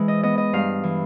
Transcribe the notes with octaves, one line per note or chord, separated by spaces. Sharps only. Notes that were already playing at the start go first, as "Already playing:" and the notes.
Already playing: E3 G#3
D#5
B3 D#5
D#5
G2 F5
E3